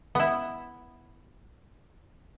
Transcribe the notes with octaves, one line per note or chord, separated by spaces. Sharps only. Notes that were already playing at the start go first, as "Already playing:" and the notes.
B3 E4